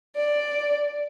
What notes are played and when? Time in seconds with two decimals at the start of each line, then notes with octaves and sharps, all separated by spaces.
0.16 D5